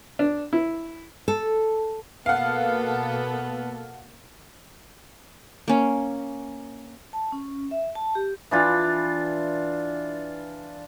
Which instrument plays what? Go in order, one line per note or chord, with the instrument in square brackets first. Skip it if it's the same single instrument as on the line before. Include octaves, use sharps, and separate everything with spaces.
[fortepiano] D4
E4
[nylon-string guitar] A4
[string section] B2 A#3 A4 [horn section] B3 [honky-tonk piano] F5 F#5
[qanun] A#3 C#4
[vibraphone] A5
C#4
E5
A5
G4
[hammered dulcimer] E3 D4 F4